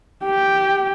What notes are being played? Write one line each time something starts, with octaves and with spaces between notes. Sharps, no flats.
G4 G5